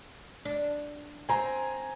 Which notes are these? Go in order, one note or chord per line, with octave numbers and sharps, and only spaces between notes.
D4
C4 G#5 A#5